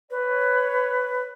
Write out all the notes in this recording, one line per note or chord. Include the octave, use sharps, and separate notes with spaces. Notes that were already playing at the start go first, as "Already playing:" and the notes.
B4 C#5